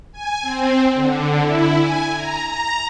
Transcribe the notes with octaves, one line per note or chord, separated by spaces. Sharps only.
G#5
C4
D3
E4
G#5
A#5
A#5